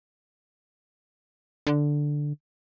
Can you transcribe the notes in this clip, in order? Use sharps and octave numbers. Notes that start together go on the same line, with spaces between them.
D3